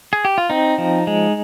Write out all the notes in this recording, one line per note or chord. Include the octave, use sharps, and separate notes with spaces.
G#4
G4
F4
C4 D#4
F3
G#3